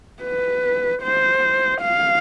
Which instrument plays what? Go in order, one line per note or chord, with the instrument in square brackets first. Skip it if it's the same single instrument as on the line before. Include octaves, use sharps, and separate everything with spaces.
[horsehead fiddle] B4
C5
F5